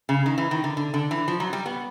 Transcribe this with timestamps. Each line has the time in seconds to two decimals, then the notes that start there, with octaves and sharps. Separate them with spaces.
0.09 C#3
0.26 D#3
0.38 E3
0.51 D#3
0.64 D3
0.77 D3
0.94 D3
1.11 E3
1.28 F3
1.40 F#3
1.53 G3
1.66 B3